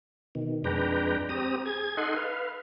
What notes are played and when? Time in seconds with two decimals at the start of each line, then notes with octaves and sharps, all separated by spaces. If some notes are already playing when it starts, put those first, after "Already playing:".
0.35 B2 D#3
0.64 F2 G#3 D4 B4 G5 A#5
1.29 C4 G4 A#5 D#6
1.65 G#4 G#6
1.97 D#4 A4 D#5 F#5 C6
2.16 B4 F5